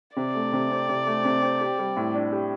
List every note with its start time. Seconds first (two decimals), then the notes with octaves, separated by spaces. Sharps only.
0.16 C3 D5
0.35 A3
0.53 C3
0.70 C4
0.89 C3
1.06 A3
1.25 C3
1.42 C4
1.61 G4
1.78 G3
1.96 A2
2.14 D4
2.32 G4